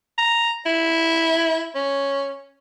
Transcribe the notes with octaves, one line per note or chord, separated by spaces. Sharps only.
A#5
E4
C#4